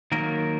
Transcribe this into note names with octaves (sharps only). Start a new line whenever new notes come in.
D#3 F#3 A#3 A#4